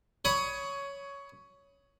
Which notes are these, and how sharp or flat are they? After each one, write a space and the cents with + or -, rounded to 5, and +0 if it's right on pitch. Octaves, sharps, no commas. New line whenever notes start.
C#5 +10 B5 +0 D#6 +20